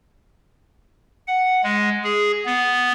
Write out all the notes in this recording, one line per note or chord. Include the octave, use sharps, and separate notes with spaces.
F#5
G#3
G#4
B3